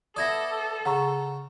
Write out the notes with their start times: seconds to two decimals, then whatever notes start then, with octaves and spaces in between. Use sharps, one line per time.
0.16 B3 E4 A4 D5 D#6 G#6 A#6
0.85 C#3 F#5 A#5 C#6